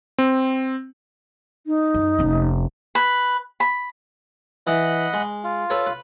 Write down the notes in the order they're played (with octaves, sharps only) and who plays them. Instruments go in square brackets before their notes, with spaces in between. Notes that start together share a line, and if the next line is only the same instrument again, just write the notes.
[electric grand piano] C4
[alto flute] D#4
[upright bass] F#2
F1 C#4
[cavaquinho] B4
B5
[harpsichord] E3 [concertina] D#5 F#5 B5
[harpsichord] G#3
[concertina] F4
[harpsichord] A4 B4 C#5
B4